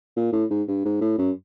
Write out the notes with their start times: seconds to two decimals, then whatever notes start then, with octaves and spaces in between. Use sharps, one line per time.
0.17 A#2
0.33 A2
0.51 G#2
0.68 G2
0.85 G#2
1.01 A2
1.18 F#2